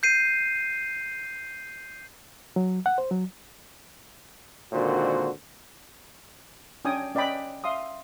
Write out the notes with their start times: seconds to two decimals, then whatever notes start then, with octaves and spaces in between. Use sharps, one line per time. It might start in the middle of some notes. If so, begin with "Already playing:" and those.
0.03 G6 C7 D#7
2.56 F#3
2.86 F#5
2.98 C5
3.11 F#3
4.73 G#1 A#2 D3 D#3 F#4 C5
6.85 C#4 D4 G5 G#5 D#6
7.15 C#4 D5 D#5 G5 B5
7.64 E5 F5 C6 D#6